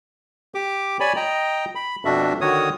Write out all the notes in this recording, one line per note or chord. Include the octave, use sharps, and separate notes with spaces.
G4 D6
C#5 D5 G#5 B5
D#5 G5 A#5
B5
F2 B2 D4 F#4 E5
D3 D#3 F#4 C#5 D#6